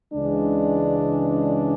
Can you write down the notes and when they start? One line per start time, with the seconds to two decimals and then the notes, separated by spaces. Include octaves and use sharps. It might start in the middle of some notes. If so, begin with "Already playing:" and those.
0.11 C#2 C#3 E3 G#3 D4